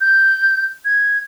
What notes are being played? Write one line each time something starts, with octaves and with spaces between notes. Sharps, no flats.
G6
G#6